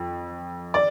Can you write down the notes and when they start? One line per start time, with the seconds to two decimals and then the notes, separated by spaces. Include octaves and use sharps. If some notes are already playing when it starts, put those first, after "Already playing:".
Already playing: F2
0.74 D5